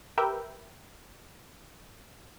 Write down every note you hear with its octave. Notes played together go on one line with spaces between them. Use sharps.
G4 A#4 B4 E5 G5